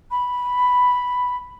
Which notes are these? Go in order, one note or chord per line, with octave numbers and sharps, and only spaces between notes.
B5